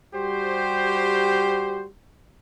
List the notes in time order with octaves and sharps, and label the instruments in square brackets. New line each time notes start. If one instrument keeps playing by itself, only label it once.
[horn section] G3 F#4 G4 C5